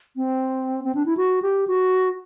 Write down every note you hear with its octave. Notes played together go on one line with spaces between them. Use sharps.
C4
C4
D4
E4
F#4
G4
F#4